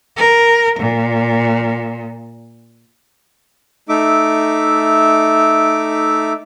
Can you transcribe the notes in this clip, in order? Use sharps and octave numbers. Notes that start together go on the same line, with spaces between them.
A#4
A#2
A3 D#4 E5 D6